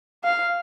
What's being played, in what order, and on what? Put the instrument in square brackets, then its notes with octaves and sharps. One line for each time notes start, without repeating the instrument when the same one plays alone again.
[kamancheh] F5